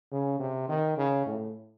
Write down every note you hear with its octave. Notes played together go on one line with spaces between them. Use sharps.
C#3
C3
D#3
C#3
A2